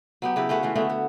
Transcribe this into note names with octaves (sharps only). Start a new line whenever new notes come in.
F#3 B3 G4
C#3 E4 G4 B4
A3 C#4 F#4 B4
E3 A3 F4
D3 A3 B3 F#4
F#4